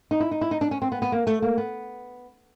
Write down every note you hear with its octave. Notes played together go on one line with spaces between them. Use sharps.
D#4
E4
D#4
E4
D#4
D4
C#4
C4
B3
B3
A#3
A3
A#3
B3